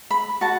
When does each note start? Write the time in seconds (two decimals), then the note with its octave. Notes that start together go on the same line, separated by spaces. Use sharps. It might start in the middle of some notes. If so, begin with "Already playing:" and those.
0.11 B5
0.41 F#4 A5